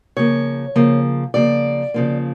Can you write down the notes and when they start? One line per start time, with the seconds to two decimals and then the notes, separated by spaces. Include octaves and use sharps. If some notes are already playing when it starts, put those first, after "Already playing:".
0.17 C#3 F3 A#3 C#5
0.76 C#3 F3 A#3
1.34 C#3 F3 A#3 D5
1.94 C#3 F3 A#3